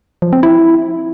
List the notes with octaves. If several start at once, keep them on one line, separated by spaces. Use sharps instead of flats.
F3
C4
E4